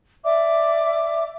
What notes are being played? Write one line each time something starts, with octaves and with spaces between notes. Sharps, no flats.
D5 E5 D6